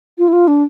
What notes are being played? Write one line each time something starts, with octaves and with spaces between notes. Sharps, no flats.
F4
E4
F4
D4